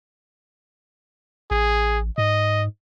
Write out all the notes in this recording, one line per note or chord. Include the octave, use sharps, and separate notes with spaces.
A1 G#4
G#2 D#5